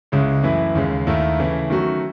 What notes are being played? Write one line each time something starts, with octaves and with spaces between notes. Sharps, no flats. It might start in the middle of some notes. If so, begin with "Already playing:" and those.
C#2 C#3 G#3 C#4 E4
F#2 E3 A3 E4 B4
D#2 C#3 G#3
D#2 D#3 A3 E4
C#3 E3 A3 E4
D#3 F#3 A3 C#4 F#4